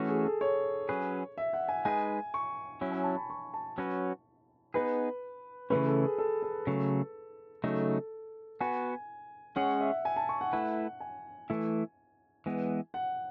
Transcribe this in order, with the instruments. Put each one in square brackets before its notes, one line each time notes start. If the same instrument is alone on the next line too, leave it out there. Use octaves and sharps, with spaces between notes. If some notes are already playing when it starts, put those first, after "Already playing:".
Already playing: [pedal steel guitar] E3 A3 C#4 F#4
[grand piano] G#4
A4
C#5
[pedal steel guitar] F#3 C#4 G#4 B4
[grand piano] E5
F#5
G#5
[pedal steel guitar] G#3 D#4 G#4 B4 [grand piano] G#5
[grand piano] C#6
[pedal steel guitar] F#3 C#4 E4
[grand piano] G#5
A5
B5
C#6
A5
[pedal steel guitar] F#3 C#4 F#4 B4
[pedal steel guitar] B3 D#4 G#4 [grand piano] B4
[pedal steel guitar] C#3 E3 A3 C#4 [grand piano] B4
[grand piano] A4
G#4
A4
A4
[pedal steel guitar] C#3 F#3 A3
[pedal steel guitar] C#3 F#3 A3 D#4 [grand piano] A4
[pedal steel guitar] B3 F#4 B4 [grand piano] G#5
[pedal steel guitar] G#3 C#4 G#4 C#5 [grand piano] F#5
[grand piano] E5
G#5
A5
C#6
F#5
[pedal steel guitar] A3 E4 B4
[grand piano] G#5
[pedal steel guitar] E3 A3 E4
E3 G#3 B3
[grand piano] F#5